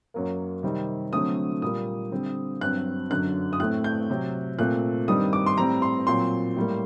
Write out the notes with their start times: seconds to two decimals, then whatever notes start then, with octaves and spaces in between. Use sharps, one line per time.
0.14 F#2 F#3 A#3
0.63 C3 D#3 G3 C4
1.13 D3 F#3 A3 C4 D#6
1.62 A#2 G3 A#3 D#6
2.11 D3 G3 C4
2.61 G2 F#3 C4 F#6
3.10 F#2 D3 F#3 F#6
3.53 D#6
3.60 A2 A3 C4 F#6
3.84 G6
4.10 C3 F#3 C4
4.59 A#2 A3 C4 F#6
5.08 G2 D#3 G3 C4 D#6
5.33 D6
5.46 C6
5.58 A2 G3 C4 A#5
5.82 C6
6.07 A#2 F#3 C4 C6
6.56 A2 G3 A#3